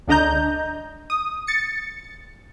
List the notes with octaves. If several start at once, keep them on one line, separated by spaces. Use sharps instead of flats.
C#2 D3 D4 D#5 A#5 G6
D#6
A6 C#7